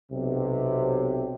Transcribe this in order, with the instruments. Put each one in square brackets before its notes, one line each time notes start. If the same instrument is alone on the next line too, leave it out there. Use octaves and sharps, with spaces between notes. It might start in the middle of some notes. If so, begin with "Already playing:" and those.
[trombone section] B1 C3